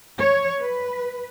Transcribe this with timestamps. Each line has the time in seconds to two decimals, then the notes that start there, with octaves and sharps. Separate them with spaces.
0.17 C#5
0.60 B4